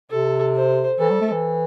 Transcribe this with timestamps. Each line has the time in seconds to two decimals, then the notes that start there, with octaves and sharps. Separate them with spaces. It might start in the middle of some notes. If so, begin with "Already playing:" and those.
0.11 C3 A4
0.56 C5
0.99 E3 A4
1.10 G3
1.21 A3
1.32 E3